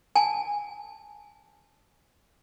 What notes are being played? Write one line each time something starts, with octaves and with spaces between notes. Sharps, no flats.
G#5 A5